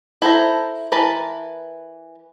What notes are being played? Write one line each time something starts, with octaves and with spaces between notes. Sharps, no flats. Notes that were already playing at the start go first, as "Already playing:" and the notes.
E4 A4 C5 A#5
E3 A#4 B4 A5 B5